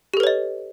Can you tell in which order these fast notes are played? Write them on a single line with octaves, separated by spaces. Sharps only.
G4 A4 B4 C#5 D#5